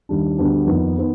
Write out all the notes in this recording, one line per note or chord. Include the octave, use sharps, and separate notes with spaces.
D#2 D#3 G3 D4
D2 D3 G3 B3 D4
F2 D#3 B3 D#4
D#3 B3